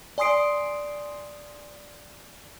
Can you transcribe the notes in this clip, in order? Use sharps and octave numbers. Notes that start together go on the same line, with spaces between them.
D5 G#5 C6 D#6 C7 D7